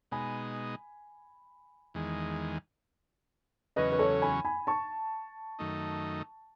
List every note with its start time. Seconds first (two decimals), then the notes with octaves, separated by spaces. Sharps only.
0.11 B2 G#3 D#4 G#5 B5
1.94 E2 D#3 G#3
3.76 E2 C#3 F#3 C#4 B4 D#5
3.92 B4
3.99 A4 C#5
4.22 G#5 B5
4.45 G#5 B5
4.67 A5 C#6
5.59 F#2 D#3 A3 D#4